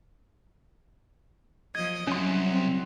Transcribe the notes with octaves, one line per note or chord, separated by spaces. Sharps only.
F3 D#5 G#6
C2 F#3 C#4 C6
C4